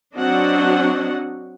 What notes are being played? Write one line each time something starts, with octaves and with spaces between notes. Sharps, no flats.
F#3 C4 D4 F#4 D#5 F#5